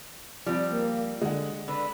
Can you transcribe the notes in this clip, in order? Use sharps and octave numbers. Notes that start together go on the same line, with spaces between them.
F3 G3 C4
A#3
D3 G#3 F#5
D3 B4 B5